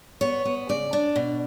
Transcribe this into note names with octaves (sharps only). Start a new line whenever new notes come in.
B3 C#5
B3
C#3 D5
D4
B2